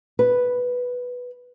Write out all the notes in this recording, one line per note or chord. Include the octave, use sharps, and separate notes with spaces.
B4